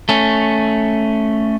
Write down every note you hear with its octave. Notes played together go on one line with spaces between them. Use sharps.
A3 C#4